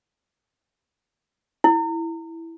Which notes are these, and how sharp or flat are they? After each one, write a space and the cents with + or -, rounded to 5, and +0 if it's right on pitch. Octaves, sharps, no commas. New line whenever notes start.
E4 -5